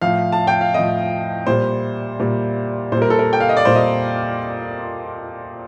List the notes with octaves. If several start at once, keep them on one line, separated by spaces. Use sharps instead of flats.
A2 F3 F5
A5
G5
F5
A2 F3 D#5
A#2 G3 C5
A#2 G3
A#2 C5
G3 A#4
A4
A#4
G5
F5
D#5
D5
A#2 G3 C5
D#5